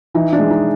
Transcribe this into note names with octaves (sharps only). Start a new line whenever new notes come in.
E3 D#4
D4
G#3
D#4